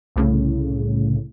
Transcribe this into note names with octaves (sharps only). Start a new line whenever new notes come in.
C2 A2 C#3